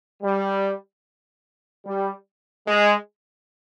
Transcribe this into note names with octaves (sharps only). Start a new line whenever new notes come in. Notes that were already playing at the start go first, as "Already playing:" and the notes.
G3
G3
G#3